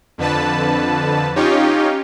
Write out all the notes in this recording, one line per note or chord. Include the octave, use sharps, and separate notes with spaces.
F2 D3 B4 A5
C#4 D#4 F4 G4 C#5